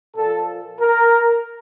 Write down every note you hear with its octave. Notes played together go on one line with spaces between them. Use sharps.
A#2 F3 A4
A#4